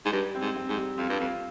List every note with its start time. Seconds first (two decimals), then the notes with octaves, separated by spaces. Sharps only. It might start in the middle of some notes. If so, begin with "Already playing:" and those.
0.06 G#2
0.12 G2 G3
0.35 C4
0.41 G#2
0.55 C4
0.69 G#2
0.77 G3
0.98 F2 F4
1.09 G2
1.20 F2 F4